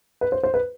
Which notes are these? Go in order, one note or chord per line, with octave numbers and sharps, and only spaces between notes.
B4
C5
C5
B4